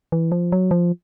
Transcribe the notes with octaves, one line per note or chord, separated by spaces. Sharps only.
E3
F3
F#3
F3